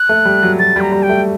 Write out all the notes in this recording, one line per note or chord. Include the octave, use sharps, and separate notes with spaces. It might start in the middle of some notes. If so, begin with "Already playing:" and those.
Already playing: F#6
A3
G3
F#3
F#3 A6
G3
A#5
G3
G5
A3